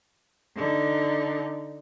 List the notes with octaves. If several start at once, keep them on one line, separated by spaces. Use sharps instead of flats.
D3 D#4